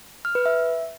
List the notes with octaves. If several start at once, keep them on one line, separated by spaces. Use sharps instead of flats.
F6
B4
E5